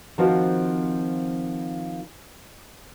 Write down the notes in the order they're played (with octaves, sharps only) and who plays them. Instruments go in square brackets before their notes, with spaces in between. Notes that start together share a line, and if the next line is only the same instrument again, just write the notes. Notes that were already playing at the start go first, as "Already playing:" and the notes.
[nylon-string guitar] D#3 F3 C4 F4 F#4 C5